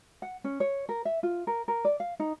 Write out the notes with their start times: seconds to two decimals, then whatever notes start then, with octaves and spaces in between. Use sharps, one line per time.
0.22 F#5
0.44 C#4
0.60 C#5
0.89 A#4
1.05 E5
1.23 F4
1.47 A#4
1.68 A#4
1.85 D5
2.00 F5
2.20 D#4